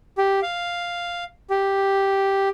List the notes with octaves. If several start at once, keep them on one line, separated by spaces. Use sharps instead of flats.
G4
F5
G4